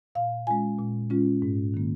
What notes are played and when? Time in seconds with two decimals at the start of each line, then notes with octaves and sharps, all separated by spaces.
0.15 A#2 F5
0.47 G#3 C#4 F4 G#5
0.79 A#2
1.10 G#3 C#4 F4
1.42 G#2
1.74 D#3 A#3